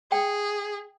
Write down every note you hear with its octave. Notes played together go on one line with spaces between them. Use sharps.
G#4 G5